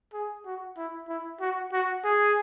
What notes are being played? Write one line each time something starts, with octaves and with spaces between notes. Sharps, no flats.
G#4
F#4
E4
E4
F#4
F#4
G#4